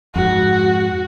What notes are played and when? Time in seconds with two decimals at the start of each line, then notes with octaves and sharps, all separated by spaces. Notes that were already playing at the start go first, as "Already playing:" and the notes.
0.16 F2 G#2 F#4